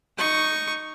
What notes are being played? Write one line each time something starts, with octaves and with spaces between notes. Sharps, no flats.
D#4 C#6